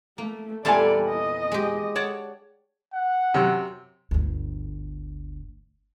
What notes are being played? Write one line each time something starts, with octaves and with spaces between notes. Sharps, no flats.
A3 A#3
E2 A#2 G3 A4 D5 F5 G#5 A5
D#5
G#3 G4
C#5 D5 F#5 A5
F#5
F#2 C3
G1 D2